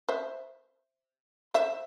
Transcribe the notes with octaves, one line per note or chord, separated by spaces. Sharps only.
C5 E5
C5 E5